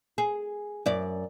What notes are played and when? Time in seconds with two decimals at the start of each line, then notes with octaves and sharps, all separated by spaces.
0.18 G#4
0.86 F#2 D5